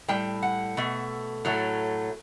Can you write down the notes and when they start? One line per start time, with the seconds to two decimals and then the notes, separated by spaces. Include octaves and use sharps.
0.08 A2 G3 G5
0.42 F#5
0.77 B2 A3
1.45 A2 F#3 A3